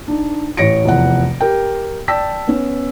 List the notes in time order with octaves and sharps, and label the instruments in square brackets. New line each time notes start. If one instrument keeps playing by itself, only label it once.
[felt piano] D4 D#4
A1 C#5 A#6 C#7 D7
F1 E2 F#5
G4 A#4 G5
D5 G5 A5 E6 B6
B3 C#4